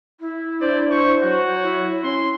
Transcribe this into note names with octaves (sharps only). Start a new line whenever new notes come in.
E4
D4 C5 D5
E4 C5 C#6
F#3 F#4 C#5
E4
C#4 C6